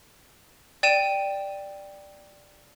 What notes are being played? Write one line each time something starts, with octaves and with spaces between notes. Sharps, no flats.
D5 G5 D#7 E7